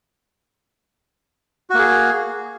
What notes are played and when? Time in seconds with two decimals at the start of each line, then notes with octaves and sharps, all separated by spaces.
1.70 F#4
1.74 A#3
1.79 G#4